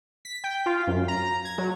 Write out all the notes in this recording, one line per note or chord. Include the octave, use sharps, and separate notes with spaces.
B6
G5
F4
F#2
A#5
G#6
F#3